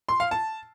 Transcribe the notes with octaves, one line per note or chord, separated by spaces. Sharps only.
C6
F5
A5